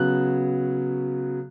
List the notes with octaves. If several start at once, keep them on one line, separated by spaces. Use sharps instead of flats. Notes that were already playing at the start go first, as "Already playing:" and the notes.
Already playing: C#3 F#3 B3 F#6